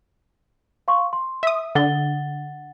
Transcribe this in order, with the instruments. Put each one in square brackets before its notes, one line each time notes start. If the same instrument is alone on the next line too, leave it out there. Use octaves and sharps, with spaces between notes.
[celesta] F5 C6 C#6
C6
[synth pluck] E5 D#6
[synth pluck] D3 [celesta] F#5 A6 G7